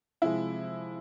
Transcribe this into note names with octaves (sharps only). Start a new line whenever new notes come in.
C3 F3 G#3 E4